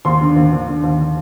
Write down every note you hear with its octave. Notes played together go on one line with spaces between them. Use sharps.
D#2 C6
D3
D#2
D#2
D3
D#2